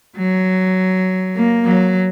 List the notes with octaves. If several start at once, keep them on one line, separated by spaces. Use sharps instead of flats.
F#3
A#3
F#3